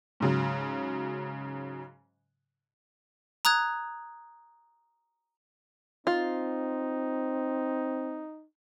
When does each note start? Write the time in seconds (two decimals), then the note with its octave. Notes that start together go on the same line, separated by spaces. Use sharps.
0.20 G#2 C#3 F#3
3.45 A#5 D#6 F#6 G#6
6.07 C4 D#4 F4